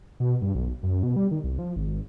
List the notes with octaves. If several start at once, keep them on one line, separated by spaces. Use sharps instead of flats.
B2
G2
B1
F#2
B2
G3
D#3
C2
F3
G#1